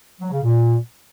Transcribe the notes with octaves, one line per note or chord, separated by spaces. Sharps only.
F#3
C#3
A#2